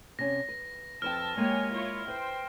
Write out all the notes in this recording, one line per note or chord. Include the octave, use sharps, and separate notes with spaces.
C3 C#4 A#6
B4
F2 B4 G5 A5 E6 F6
G#3 A#3 G4 C#5 G#5
E4 F4 C#5
B4 C5 G5